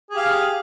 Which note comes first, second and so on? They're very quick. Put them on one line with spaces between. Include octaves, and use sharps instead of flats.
G#4 G4 F5